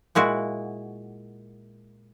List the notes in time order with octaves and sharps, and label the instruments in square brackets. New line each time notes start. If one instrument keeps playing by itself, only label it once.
[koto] A#2 G#3 E4 F#4